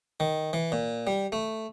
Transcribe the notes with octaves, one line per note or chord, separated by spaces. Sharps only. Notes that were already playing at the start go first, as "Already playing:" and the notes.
D#3
E3
A#2
G3
A3